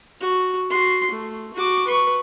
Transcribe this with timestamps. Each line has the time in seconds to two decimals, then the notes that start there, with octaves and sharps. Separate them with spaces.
0.21 F#4
0.70 F#4 C6
1.11 A3
1.54 F#4 D6
1.87 B4 C#6